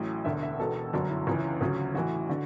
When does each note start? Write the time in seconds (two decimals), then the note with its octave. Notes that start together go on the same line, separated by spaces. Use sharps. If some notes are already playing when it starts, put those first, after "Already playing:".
Already playing: A1 A2 F#3
0.25 E1 D2 D3 E5
0.42 E5
0.59 E1 E2 B2 A4
0.93 G1 F#2 D3 F#3 D4
1.10 E4
1.27 C#2 C#3 E3
1.61 D2 C#3 F#3
1.94 A1 A2 E3 F#4
2.29 D3 F#4